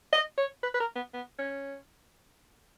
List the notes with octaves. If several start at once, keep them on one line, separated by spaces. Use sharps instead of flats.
D#5
C#5
B4
B4
A#4
B3
B3
C#4